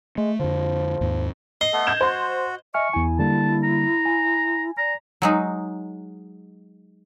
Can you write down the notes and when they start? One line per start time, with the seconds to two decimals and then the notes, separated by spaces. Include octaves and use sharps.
0.18 G#3 A3
0.40 F2 D3 F3
1.01 D#2 G#2
1.61 D#5 C7
1.73 A3 B3 A4
1.87 G6 G#6 E7
2.01 F#4 C5 C6
2.74 D#5 E5 G#5 C#6 F6
2.93 E2 E4 G#5
3.19 D3 G3 A#3 A5
3.63 A#5
4.06 G#5
4.78 D5 A#5
5.22 F#3 G#3 D#4